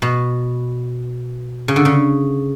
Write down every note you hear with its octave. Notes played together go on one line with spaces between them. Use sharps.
B2
C#3
D3
C#3